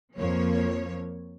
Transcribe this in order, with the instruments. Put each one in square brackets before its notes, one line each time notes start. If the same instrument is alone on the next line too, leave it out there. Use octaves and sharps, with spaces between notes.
[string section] F2 F3 A#3 C#5